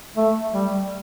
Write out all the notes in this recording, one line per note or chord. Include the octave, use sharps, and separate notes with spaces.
A3
G3